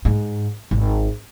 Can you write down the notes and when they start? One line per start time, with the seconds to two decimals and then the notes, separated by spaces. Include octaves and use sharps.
0.05 G#2
0.71 G#1